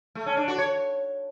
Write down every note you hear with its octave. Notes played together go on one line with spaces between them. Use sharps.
A3
C#4
D4
F#4
C#5